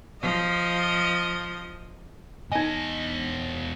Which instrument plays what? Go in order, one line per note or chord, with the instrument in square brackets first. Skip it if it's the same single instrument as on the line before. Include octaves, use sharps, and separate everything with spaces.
[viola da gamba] F3 D#5
[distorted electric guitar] E2 D#5 [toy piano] D#4 G#5